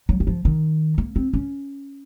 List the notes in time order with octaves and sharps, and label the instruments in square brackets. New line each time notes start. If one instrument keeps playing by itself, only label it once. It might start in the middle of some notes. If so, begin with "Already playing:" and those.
[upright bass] F#3
D#3
F3
D#3
A#3
C4
C#4